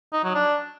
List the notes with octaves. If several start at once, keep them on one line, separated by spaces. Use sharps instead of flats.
D#4
F#3
D4